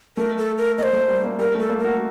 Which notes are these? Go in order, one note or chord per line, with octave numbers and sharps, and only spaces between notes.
A3 A#4
A4
A#4
A#3 D#5
C5
A3
G3
A#3
G3 A#4
A3
A4
A#3
F#4 A#4